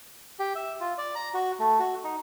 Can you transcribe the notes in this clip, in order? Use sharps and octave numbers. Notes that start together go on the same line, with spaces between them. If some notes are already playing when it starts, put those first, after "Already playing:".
G4
E5
F4
D5
A#5
F#4
A3
F#4
D#4